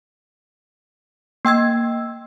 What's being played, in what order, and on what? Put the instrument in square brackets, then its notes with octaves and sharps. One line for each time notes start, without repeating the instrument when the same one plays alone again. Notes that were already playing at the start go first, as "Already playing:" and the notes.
[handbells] A#3 G5 E6 G#6